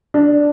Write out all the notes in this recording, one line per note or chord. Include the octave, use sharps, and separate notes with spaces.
D4